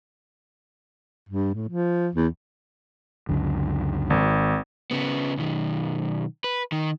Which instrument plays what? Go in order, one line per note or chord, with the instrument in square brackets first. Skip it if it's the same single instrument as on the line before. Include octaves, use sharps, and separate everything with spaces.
[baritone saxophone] G2
A2
F3
E2
[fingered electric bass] C#2 F#2 D3
[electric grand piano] G#1
[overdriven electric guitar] C#3 B3
B1 D#3
B4
D#3